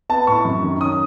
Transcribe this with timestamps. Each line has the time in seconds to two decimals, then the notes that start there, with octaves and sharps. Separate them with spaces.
0.09 B3 A5
0.27 A2 C#6
0.45 F#2
0.62 D#3
0.81 C#4 D#6